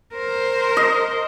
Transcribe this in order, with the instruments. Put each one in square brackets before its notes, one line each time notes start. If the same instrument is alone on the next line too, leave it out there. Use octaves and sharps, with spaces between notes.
[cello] A#4 C5
[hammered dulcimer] D#5